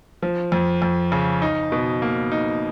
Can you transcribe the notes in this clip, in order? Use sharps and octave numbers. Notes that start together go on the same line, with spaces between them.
F3
F2
F2
C#3
D#4
B2
A#3
D#4